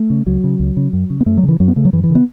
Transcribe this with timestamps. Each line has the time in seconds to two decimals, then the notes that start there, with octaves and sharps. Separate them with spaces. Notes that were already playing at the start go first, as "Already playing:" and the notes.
Already playing: A3
0.10 C#3
0.27 C#2 F#3
0.44 C#3
0.59 C#2
0.77 C#3
0.93 F#2
1.10 C#3
1.21 B3
1.26 F#2 A3
1.37 F#3
1.43 C#3
1.48 E3
1.60 F#2 F#3
1.68 B3
1.76 C#3 A3
1.85 F#3
1.93 F#2 E3
2.04 E3
2.10 C#3
2.15 B3